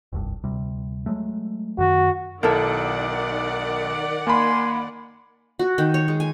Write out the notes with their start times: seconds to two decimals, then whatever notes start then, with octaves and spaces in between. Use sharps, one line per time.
0.13 F1 C2 G2
0.44 D2 C3 G3
1.06 F#3 G#3 A3
1.78 F#2 D#3 F#4
2.43 B1 D#3 E4 A4 A#4 D5 F#5
4.27 A#3 G#5 B5 C6
5.59 F#4
5.78 D#3
5.94 C#5
6.08 G#3
6.20 G#5